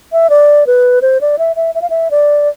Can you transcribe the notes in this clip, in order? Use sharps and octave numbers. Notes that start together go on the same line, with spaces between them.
E5
D5
B4
C5
D5
E5
E5
E5
F5
E5
D5